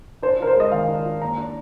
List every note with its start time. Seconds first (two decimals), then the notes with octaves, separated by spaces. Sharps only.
0.22 D4 C5
0.39 F4 A#4
0.47 C5
0.56 G#3 D#5
0.72 D#3 F5
0.89 D4
1.05 F4
1.22 A#3 A#5
1.38 D4